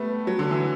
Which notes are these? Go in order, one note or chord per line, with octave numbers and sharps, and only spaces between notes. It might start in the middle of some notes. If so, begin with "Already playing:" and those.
Already playing: G3 A3 B3
F#3
D3
E3